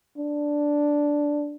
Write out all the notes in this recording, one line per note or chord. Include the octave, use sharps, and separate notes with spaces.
D4